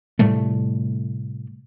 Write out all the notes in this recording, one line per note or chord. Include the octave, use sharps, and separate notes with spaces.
A2 C3 G3 A3